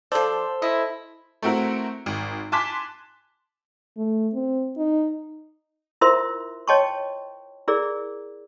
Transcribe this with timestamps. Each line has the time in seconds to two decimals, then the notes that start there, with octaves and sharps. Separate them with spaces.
0.12 F3 A4 C5 D5 A5 C6 E6
0.62 E4 D#5
1.43 A3 C4 E4 F#4 A#4
2.06 G#1
2.52 G#5 A5 C6 D6 F#6 B6
3.97 A3
4.34 C4
4.78 D#4
6.01 E4 F4 A#4 C5 E5 C6
6.68 C#5 D#5 G5 A5 C6 C#6
7.68 E4 G#4 A#4 D5